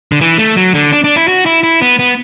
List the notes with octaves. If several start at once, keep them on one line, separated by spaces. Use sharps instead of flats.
D3
E3
A3
F#3
D3
D4
D4
E4
F#4
E4
E4
B3
B3